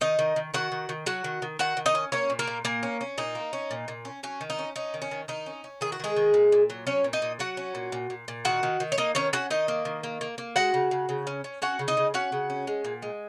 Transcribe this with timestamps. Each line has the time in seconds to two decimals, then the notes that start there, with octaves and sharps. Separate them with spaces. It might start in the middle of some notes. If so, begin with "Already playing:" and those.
0.01 D#3 D#4 D#5
0.19 D#3
0.36 D#3
0.54 D#3 F#4 F#5
0.72 D#3
0.89 D#3
1.06 F#3 F#4 F#5
1.24 D#3
1.42 D#3
1.59 D#3 F#4 F#5
1.77 D#3
1.86 D#4 D#5
1.95 C#4
2.12 A#3 C#4 C#5
2.30 A#2
2.39 A#3 A#4
2.47 A#2
2.65 A#2 A#3 A#4
2.83 C#4
3.01 C#4
3.18 A#2 D#4
3.35 A#3
3.53 C#4
3.71 A#2
3.88 A#2
4.05 C#4
4.23 F#3 C#4
4.41 D#3
4.50 D#4
4.59 C#4
4.76 C#4 D#4
4.94 D#3
5.02 C#4
5.11 D#3
5.28 D#3 D#4
5.46 C#4
5.64 C#4
5.81 D#3 G#4
5.92 F#4
6.00 D#3 G#3 G#4
6.16 D#3
6.34 A#2
6.52 A#2
6.70 F#3
6.87 F#3 C#4 C#5
7.04 A#2
7.13 D#4 D#5
7.22 A#2
7.39 F#3 F#4 F#5
7.57 C#4
7.75 A#2
7.92 A#2
8.10 A#2
8.28 A#2
8.45 D#3 F#4 F#5
8.63 D#3
8.80 D#3
8.92 C#5
8.98 A#3 D#4 D#5
9.15 D#3 C#4 C#5
9.33 C#4 F#4 F#5
9.50 D#3 D#4 D#5
9.68 A#3
9.85 D#3
10.03 A#3
10.21 A#3
10.38 A#3
10.56 G#3 F#4 F#5
10.74 C#3
10.91 C#3
11.09 C#3
11.27 C#4
11.44 C#4
11.62 C#4 F#4 F#5
11.79 C#3
11.88 D#4 D#5
11.97 C#3
12.14 C#4 F#4 F#5
12.32 C#3
12.50 C#4
12.67 G#3
12.84 A#2
13.02 G#3